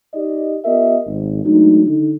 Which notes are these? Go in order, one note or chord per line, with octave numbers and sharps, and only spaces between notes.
D#4 G4 D5 D#5
B3 F4 G4 A#4 D#5 E5
G#1
F#3 G#3 A3 D4 D#4
D3 D#4